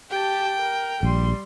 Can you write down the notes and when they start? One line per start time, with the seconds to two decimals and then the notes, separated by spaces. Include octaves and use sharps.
0.10 G4 G5 A5
0.58 A#4
1.03 A#1 G3 C6